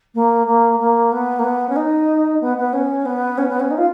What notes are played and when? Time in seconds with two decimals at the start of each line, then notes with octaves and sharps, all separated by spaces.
0.14 A#3
0.46 A#3
0.79 A#3
1.11 B3
1.39 A#3
1.43 B3
1.68 C#4
1.75 D#4
2.40 B3
2.57 B3
2.73 C#4
3.05 B3
3.37 C#4
3.48 B3
3.59 C#4
3.70 D#4
3.77 F4